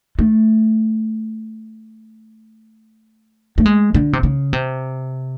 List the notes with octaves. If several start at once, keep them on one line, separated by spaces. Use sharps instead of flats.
A3
A3
G#3
D3
C3
C#3
C3